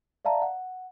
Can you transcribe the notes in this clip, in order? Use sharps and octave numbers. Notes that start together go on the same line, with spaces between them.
D5 E5 F5 A5 A#5
F#5